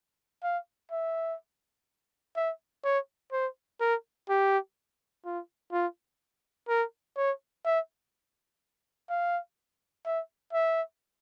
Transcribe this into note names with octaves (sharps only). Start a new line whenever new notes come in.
F5
E5
E5
C#5
C5
A#4
G4
F4
F4
A#4
C#5
E5
F5
E5
E5